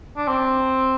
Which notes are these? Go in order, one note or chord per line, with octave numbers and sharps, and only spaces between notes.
D4
C4